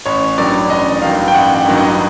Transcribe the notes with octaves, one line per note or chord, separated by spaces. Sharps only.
A1 C#5
G2 D#3 F#3 D5
A1 D#5
G2 D#3 F#3 F5
G5
A1 F#5
G5
G2 D#3 F#3
D#5